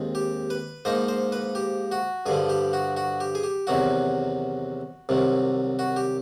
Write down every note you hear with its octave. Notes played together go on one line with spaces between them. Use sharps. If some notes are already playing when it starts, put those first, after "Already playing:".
Already playing: D#2 D#3 G#3 C4
G4
B4
G#2 F3 A#3 D#4 C5
C5
B4
G4
F#4
G2 D3 F3 G#4
G4
F#4
F#4
G4
G#4
G4
E2 C3 D#3 F#3 F#4
C2 C3 D#3 F#3
F#4
G4